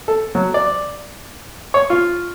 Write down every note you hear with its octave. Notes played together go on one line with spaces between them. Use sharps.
A4
F#3
D5
C#5
F4